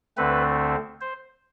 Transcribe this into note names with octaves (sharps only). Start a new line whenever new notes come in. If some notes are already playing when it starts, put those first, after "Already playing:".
D2 D3 A3 C4 B4
C5